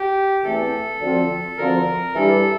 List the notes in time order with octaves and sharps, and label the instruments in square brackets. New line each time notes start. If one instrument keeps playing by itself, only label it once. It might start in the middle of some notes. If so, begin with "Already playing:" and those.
Already playing: [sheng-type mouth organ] G4
[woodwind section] E2 E3 A3 C4 [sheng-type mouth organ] A4
[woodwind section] D2 D3 F3 C4 F4
[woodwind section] D2 D3 F3 C4 F4 [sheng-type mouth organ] A#4
[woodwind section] G2 E3 G3 D4 G4 [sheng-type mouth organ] A4